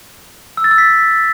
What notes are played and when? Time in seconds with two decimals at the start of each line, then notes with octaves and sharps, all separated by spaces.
0.57 E6
0.64 A6
0.71 E6
0.78 B6